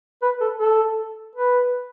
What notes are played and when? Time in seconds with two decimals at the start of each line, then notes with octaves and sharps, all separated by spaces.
0.22 B4
0.41 A4
0.60 A4
1.35 B4